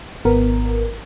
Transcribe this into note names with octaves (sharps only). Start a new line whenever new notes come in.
G#1 B3 A#4